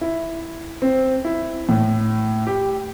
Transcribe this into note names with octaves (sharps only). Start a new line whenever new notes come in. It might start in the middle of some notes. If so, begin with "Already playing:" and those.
E4
C4
E4
A2
G4